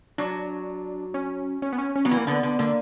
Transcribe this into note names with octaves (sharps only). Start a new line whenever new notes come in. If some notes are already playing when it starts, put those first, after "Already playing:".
F#3 D4
C#4
C#4
B3
C#4
C#4
F#3 B3
E3
A#3
D3 B3
D3
D3 A#3